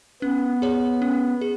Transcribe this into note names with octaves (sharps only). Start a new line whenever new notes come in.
B3 C#4
G#4 C#5
C#4
G#4